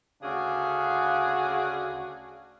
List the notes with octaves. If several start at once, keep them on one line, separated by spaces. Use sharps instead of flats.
D2 C#3 D4 F#4 G#4 F5